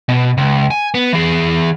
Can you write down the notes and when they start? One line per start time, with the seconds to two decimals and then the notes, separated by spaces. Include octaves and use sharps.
0.09 B2
0.38 C#2
0.71 G#5
0.94 B3
1.13 E3 G#4